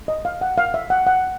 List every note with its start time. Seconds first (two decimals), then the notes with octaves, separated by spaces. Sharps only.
0.08 D#5
0.25 F5
0.41 F#5
0.58 F5
0.74 E5
0.90 F#5
1.07 F#5